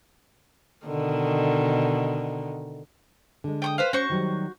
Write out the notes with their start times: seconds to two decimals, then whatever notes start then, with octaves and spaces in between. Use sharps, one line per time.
0.86 B2 D3 D#3
3.44 D3 G#3
3.62 G5 C#6 D#6
3.78 B4 C5 F5
3.93 C#4 F#4 C5 C#6
4.10 D#3 F#3 G3